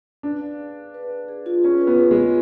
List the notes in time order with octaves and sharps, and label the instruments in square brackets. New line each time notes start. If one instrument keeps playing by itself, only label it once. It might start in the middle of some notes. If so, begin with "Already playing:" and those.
[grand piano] D4 [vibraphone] B4
[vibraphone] F5
G#4
G#4
B4
B4
G#4
F4
[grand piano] C#4 [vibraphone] G#4
[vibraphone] B4
[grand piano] B3
[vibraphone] G#4
[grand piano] G#3
[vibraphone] B4